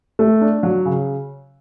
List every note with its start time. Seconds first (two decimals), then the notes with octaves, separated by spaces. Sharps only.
0.19 A3
0.41 D4
0.63 F#3
0.85 C#3